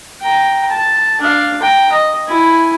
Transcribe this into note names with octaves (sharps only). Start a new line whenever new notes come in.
G5 A#5
A5
D4 F5
G5 A#5
D#5
E4 G#5